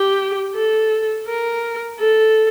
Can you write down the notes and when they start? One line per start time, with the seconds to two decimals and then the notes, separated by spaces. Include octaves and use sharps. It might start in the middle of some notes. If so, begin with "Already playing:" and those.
Already playing: G4
0.55 A4
1.27 A#4
1.99 A4